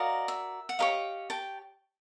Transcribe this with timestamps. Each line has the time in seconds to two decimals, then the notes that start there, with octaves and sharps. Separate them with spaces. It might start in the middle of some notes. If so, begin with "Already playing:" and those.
Already playing: F#4 A#4 D5 D#5 F5
0.28 E5
0.69 F#5
0.79 G4 A#4 C#5 D#5 F5
1.30 G5 A5